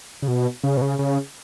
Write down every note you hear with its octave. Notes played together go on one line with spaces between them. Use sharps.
C#3
B2
C#3
B2
C#3
C#3